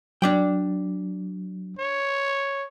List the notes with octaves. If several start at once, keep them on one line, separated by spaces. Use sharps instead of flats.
F#3 D4 D5 G5
C#5